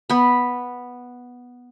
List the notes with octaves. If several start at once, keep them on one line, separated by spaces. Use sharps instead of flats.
B3 B5